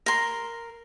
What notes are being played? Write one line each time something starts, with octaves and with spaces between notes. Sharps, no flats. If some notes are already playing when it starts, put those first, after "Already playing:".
A#4 C6